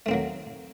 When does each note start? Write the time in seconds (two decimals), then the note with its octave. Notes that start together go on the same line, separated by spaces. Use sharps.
0.06 A3
0.08 C4
0.11 A#3
0.14 F#3